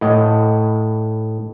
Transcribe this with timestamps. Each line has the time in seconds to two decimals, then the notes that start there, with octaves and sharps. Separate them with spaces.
0.01 A2 D#5